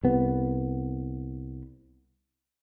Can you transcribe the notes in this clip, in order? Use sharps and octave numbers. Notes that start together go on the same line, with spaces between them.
C2 B3